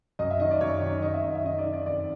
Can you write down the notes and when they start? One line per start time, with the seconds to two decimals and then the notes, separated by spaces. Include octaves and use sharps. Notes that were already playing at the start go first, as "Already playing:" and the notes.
0.19 F#2 D#5
0.30 E5
0.40 D#3 D#5
0.51 D5
0.61 F#2 C#5
0.81 D#3
1.02 D#3 D#5
1.14 E5
1.24 F#2 D#5
1.35 E5
1.45 D#3 D#5
1.58 D5
1.66 D#3
1.73 D5
1.86 F2 D5